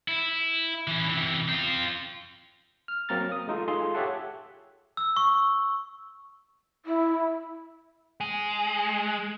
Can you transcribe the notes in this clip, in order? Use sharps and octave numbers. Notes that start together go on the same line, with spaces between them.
E4
E3 C#4
C3 E3
C4 F4
F6
F#3 A#3 C4 A#5 F6 A6
D#6
G#3 D#4 F4 A4
F4 G#4 A4 C6
G4 A4 C#5 E5 F#5 A5
E6
C#6
E4
G#3